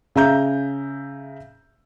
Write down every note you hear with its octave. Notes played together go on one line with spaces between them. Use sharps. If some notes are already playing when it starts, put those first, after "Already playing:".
C#3 E5 A#5 G6